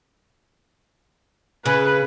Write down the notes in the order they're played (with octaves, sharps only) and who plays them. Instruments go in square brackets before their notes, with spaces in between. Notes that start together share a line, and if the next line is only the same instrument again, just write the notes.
[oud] C#3 [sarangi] B4